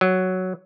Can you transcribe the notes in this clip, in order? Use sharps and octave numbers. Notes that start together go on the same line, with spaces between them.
F#3